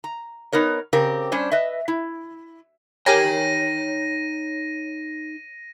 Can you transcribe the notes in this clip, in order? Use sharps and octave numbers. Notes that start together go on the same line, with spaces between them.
A#5
B3 D#4 A#4 C#5
C#3 C4 G4 A#4
G3 C#4 D4 C5
B4 D#5 E5
E4
D#4 G4 A#4 C#5 G5 G#5 A#6 D#7